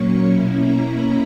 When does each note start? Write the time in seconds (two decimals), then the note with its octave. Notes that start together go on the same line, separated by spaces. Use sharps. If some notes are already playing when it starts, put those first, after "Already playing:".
Already playing: A#2 F#3 A#3 C#4 C#6
0.28 B2 A#3 C#4 E4 B5
0.56 A#5
0.86 B5